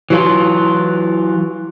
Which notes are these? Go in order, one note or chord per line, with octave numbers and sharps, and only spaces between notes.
E3 F#3 F4